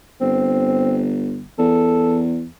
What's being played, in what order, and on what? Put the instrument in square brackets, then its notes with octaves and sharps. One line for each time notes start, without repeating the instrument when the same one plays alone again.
[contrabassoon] G1 [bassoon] C4
[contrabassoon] E2 [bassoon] A4